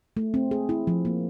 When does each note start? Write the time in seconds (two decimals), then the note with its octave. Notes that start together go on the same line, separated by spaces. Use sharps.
0.17 A3
0.34 C4
0.51 G#4
0.69 E4
0.87 F3
1.05 A#3